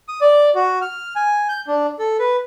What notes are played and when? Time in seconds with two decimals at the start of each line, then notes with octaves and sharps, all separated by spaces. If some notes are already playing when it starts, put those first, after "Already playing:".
0.08 D#6
0.21 D5
0.55 F#4
0.82 F6
1.16 G#5
1.49 G6
1.67 D4
1.99 A4
2.19 B4